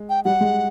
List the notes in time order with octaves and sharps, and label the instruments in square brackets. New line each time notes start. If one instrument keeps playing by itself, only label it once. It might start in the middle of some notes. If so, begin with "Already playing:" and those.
Already playing: [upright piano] G#3
[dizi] G5
[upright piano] G3 [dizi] F#5
[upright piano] G#3